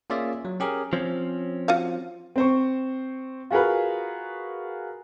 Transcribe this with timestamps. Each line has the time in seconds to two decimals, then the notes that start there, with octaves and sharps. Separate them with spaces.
0.10 A#3 C#4 F4 G#4 D5 E5
0.45 F#3
0.60 C#4 G4 G#4 A#4
0.93 F3 C4 C#4
1.68 F4 F#4 F5
2.36 C4 C5 C#6
3.50 F4 F#4 G#4 A#4 B4